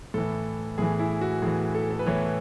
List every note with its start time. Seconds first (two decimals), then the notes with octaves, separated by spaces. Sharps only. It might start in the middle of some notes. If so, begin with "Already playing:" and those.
0.14 A2 E3 A4
0.78 A2 E3 G#4
0.99 E4
1.21 F#4
1.42 A2 E3 G#4
1.74 A4
1.90 A4
1.99 B4
2.07 A2 E3 C#5